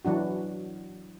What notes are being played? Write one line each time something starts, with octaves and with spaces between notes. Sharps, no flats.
E3 F#3 D4 F#4